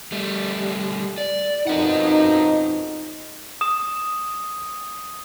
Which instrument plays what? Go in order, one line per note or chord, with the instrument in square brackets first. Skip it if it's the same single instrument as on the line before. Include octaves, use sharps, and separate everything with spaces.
[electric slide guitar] G3 A3
D5
[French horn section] F2 B2 D#4 [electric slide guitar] F#4 A#4 F#5
[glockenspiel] D#6 E7